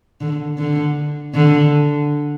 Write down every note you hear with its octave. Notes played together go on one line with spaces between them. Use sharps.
D3
D3
D3